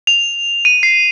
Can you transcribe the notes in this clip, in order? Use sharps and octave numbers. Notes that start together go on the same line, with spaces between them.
F7
D#7
C7